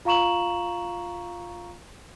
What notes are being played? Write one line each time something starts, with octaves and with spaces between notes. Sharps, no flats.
F4 F5 A#5 C#6 E7 F#7